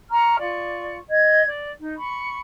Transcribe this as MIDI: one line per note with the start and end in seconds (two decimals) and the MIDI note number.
0.11 0.36 82
0.11 0.36 85
0.11 0.36 89
0.39 0.96 65
0.39 0.96 74
0.39 0.96 85
1.10 1.45 75
1.10 1.45 92
1.46 1.72 74
1.78 1.94 63
1.97 2.39 83
1.97 2.39 85